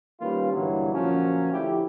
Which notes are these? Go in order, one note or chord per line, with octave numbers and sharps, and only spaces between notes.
D#3 G3 A#3 C#4 F4 B4
G2 A#2 D3 E3 F#3
D2 A#2 F3 F#3 C#4
D3 F3 A3 E4 G4